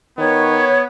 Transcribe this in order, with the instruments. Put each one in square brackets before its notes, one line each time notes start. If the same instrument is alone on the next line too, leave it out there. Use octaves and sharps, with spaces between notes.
[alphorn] D#3 [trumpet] B3 [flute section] C#5